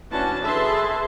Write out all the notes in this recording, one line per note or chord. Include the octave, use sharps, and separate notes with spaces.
E3 C#4 D4 F#4 A5
G#4 A4 B4 E5 A5 C6